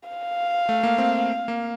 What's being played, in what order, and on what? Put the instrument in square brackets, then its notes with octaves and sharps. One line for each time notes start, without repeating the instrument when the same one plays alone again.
[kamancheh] F5
[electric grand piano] A3
A#3
C4
A#3